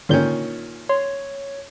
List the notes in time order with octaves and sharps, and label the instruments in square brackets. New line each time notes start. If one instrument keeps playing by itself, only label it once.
[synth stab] G#1 D3 G6 [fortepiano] A#2 D#3 C#4
[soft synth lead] C#5 [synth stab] C6